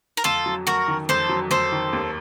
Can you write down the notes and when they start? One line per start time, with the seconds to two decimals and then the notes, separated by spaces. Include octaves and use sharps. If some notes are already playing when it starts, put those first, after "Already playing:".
0.17 A#4
0.24 F2 F4 A4
0.46 F#3
0.67 F2 F#4 A#4
0.88 D#3
1.09 F2 A4 C5
1.29 F#3
1.51 F2 A4 C5
1.72 D#3
1.93 D#2